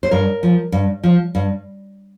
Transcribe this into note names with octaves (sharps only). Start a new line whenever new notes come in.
C5
G2 A#4
F3
G2
F3
G2